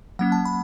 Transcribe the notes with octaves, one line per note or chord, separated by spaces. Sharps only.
F#3 A#3 C#4 F#5
A5
B5